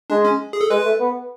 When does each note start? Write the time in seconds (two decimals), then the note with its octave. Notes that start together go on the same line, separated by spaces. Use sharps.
0.10 G#3 D4
0.25 C#4
0.53 G#4
0.61 A4
0.70 G#3 B4
0.85 A3
1.00 B3